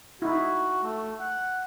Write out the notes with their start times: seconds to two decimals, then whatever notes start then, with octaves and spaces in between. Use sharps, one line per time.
0.22 D#4 E4 F#4
0.83 A3
1.20 F#5